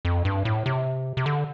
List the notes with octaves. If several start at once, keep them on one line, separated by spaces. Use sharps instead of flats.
F2
G2
A2
C3
C3
D3